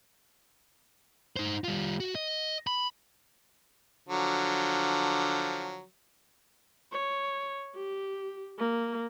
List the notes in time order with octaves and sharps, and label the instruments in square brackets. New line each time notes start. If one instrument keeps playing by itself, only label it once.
[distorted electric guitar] D#4 C5
G3 F4
F#4
D#5
B5
[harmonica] D3 F3 F#3
[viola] C#5
G4
A#3